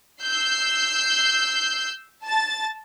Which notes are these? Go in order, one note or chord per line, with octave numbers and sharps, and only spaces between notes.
E6 G6 C7
A5 A6